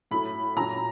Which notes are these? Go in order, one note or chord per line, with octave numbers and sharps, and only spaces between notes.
A2 F#3 B5
A#2 F#3 A#5